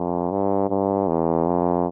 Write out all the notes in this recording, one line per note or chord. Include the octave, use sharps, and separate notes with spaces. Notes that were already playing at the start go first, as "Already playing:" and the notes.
Already playing: F2
G2
G2
E2
F2